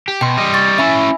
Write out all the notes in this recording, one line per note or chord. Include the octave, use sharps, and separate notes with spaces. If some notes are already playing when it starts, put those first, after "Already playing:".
G4
B2 G5 C6
G3 D#5
C#6 A6
C#4 E4 E5 G#5 B5